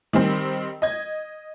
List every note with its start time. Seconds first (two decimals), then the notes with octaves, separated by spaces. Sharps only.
0.13 D#3 G3 C4
0.82 D#5 G#6